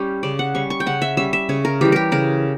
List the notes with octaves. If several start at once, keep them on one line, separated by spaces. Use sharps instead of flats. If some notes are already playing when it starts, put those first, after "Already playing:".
Already playing: G3 C#4 G4
C#3 D5
F#5
G3 C#4 C#6
C#6
G5
C#3 F#5
E5
G3 C#4 E5
E5
C#3 C#5
A#4
E3 G3 G4
G4 A#4
C#3 A#4